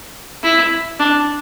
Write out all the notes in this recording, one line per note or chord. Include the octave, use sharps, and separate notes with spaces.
E4
D4